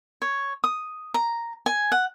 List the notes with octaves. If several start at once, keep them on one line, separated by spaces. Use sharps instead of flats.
C#5
D#6
A#5
G#5
F#5